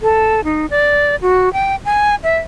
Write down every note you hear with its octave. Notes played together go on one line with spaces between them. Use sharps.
A4
D#4
D5
F#4
G5
G#5
E5